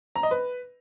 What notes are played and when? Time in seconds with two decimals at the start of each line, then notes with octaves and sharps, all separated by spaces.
0.16 A#5
0.23 D#5
0.31 B4